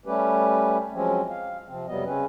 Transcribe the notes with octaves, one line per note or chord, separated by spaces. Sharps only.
G3 A3 C#4 G4 B4
F3 F#3 G#3 C4 C#4
F5
C3 F3 C4
F2 C3 F#3 G3 B3 D#5
C#3 C4 C#4 B4